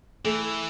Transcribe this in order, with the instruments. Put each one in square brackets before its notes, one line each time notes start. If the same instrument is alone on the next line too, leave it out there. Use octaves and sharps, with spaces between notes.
[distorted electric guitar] E3 [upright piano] A3